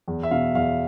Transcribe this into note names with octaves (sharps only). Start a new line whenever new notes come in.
E2
E5
B2 F5
E2 F5